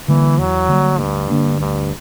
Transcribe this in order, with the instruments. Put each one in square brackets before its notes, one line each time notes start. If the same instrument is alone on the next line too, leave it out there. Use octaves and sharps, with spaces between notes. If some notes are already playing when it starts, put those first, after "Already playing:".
[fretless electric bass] D3 G3 A#3 [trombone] E3
[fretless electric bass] E2 [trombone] F#3
[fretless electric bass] D3 G3 A#3
[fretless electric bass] D2 [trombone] G2
[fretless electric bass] D3 A#3 D4
[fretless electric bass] D2 [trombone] G2